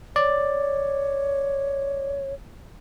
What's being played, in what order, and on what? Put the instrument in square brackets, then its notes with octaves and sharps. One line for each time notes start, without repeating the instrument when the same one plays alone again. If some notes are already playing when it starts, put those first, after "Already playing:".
[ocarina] C#5 [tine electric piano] D5